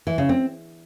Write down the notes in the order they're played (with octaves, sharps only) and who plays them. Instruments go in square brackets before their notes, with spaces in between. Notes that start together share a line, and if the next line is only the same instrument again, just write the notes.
[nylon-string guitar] E3
C#3
C4